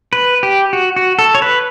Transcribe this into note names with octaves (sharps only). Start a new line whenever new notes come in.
B4
G4
F#4
F#4
A4
C#5
B4